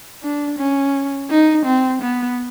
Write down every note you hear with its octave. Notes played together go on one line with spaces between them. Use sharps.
D4
C#4
D#4
C4
B3